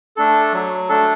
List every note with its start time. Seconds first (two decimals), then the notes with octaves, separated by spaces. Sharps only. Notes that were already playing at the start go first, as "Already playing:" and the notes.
0.17 A3 D4 A4
0.53 F#3
0.89 A3 D4 A4